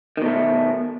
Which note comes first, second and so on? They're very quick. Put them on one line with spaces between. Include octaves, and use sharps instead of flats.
D#3 B2 A3